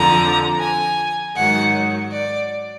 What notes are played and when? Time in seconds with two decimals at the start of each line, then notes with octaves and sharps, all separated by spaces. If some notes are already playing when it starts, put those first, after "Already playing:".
Already playing: F2 D3 F3 A#5
0.59 G#5
1.35 G#2 D#3 F#3 F#5
2.11 D5